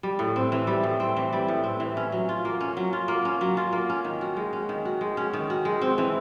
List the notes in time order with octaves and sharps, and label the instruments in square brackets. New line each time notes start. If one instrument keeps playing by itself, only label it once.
[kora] G3
A2
C4
E3
G3
A2
C4
E3
G3
A2
C4
E3
C#4
F#3
F4
A#3
C#4
F#3
F4
A#3
C#4
F#3
F4
A#3
C#4
D#3
F#4
G#3
C#4
D#3
F#4
G#3
C#4
D#3
F#4
G#3
C4
E3